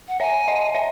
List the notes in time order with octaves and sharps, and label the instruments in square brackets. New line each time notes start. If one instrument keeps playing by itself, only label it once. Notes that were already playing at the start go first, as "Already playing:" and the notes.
[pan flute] F#5
[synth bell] C#5 E5 [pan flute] G#5
[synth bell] D#5 F#5
C#5 E5